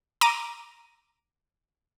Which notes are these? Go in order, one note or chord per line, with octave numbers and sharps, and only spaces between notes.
A#5 D6 D#7